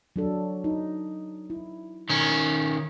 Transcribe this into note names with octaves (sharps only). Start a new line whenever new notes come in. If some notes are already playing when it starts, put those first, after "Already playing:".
F#3 D4 A4
D#4
E4
D#3 C#4